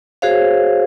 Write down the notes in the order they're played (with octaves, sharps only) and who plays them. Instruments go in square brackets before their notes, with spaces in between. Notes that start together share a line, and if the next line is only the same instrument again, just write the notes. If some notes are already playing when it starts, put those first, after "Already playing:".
[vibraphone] F#4 G#4 C5 C#5 F5